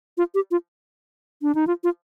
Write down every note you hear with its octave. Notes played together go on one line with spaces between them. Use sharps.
F4
G4
F4
D4
D#4
F4
F4